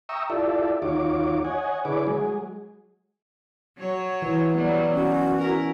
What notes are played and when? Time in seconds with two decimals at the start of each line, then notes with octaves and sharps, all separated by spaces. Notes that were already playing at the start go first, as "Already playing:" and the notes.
0.09 E5 G5 A#5 C#6 D#6 E6
0.30 E4 F4 G4 A4 D5 E5
0.82 D#2 D#4 F4 F#4 C#5 D6
1.45 C#5 D#5 F#5 G#5
1.85 D3 E4 G#4 B4 C#5 D6
2.07 F#3 G#3 G#4
3.78 F#3 C#5
4.22 E3
4.55 F#3 G3 B3
4.94 C#4 F#4
5.39 E4 A#4